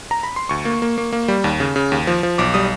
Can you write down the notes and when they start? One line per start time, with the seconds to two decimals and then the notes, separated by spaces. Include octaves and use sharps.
0.11 A#5
0.23 B5
0.36 C6
0.49 D2 C#6
0.65 A#3
0.82 A#3
0.98 A#3
1.13 A#3
1.28 G3
1.44 D#2
1.60 C#3
1.76 C#3
1.92 D#2
2.07 F3
2.23 F3
2.38 B1 D6
2.54 G3 D#6